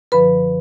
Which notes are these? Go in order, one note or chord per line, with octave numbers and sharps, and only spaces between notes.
F#2 D3 F3 B4 B5